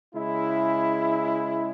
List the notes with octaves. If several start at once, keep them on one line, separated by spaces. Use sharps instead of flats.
C#3 G#3 E4